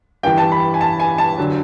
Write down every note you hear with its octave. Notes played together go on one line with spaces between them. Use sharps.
G2 E3 G5
A5
B5
G#5
A5
G#5
A5
D3 F#3